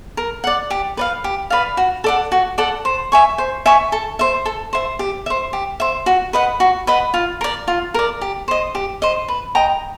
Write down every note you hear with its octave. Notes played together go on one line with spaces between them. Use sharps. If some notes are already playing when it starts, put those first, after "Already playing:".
A#4
D5 F#5
G4
B4 D5 F5
G4
B4 D5 F5
F#4
A4 D5 F#5
F#4
A4 D5 F#5
C5
E5 G#5 C#6
C5
E5 G#5 C#6
A4
C5 E5
A4
C5 E5
G4
C5 E5
G4
C5 E5
F#4
B4 D#5 F#5
F#4
B4 D#5 F#5
F4
A#4 D5
F4
A#4 D5
G4
C5 D#5
G4
C5 D#5
B4
D#5 G5 A#5